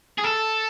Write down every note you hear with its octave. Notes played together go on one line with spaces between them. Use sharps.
G#4
A4